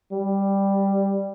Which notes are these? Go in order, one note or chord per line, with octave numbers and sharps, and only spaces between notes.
G3